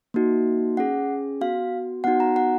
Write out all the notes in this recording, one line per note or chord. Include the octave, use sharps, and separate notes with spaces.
A#3 D#4 F#4
C#4 G#4 F#5
B3 F#4 F5
B3 D#4 F#4 F#5
A#5
F#5